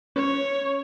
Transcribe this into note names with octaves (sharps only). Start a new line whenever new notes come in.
C#4 C#5